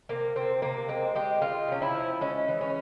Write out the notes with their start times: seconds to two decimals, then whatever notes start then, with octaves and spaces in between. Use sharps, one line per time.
0.09 C3 A#3
0.36 C3 C4
0.62 C3 A#3
0.89 G#3 C4
1.15 G#3 G4
1.41 G#3 F4
1.68 C3 C#4
1.82 E4
1.95 F3
2.21 G#3 C#4
2.48 E3
2.61 C#4